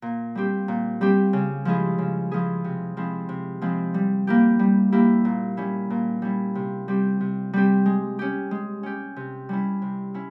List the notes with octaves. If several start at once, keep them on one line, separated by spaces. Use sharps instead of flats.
A#2
G3 C4 G4
A#2
G3 C4 G4
C#3
F3 G#3 E4 G#4
C#3
F3 G#3 E4 G#4
C3
F3 G#3 C4 E4
C3
F3 G#3 C4 E4
G3
A#3 E4 G4
G3
A#3 E4 G4
A#2
G3 C#4 E4
A#2
G3 C#4 E4
C3
G3 C4 G4
C3
G3 C4 G4
G#3
C#4 G4
G#3
C#4 G4
C3
G3 C#4 E4
C3
C#4 E4